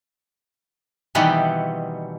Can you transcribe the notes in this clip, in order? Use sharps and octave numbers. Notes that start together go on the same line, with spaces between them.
B2 D#3 E3 G3 B3 C4